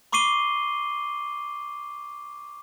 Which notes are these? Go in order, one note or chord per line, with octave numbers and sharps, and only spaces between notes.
B5 C#6 D6 C7 D#7 G7